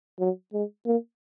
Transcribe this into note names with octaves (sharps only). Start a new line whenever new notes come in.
F#3
G#3
A#3